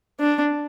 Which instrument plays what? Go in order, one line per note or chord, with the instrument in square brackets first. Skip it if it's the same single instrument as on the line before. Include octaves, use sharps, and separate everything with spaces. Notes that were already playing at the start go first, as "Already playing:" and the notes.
[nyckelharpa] D4